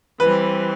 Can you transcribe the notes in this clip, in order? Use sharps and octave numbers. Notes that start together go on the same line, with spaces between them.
E3 G3 C4 B4